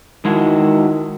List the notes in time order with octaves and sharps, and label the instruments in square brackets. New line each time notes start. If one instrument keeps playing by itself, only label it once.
[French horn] D#3 [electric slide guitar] G#3 E4 F#4